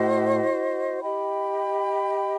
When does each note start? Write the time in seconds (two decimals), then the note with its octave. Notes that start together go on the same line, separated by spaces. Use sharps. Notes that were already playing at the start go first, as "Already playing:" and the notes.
Already playing: A2 F#4 C5 D#5
1.01 G4 D#5 G5 B5